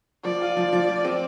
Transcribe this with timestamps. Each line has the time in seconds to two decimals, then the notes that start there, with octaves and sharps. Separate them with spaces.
0.25 F3 D5
0.41 F4
0.57 F3
0.73 F3
0.89 F3
1.05 C4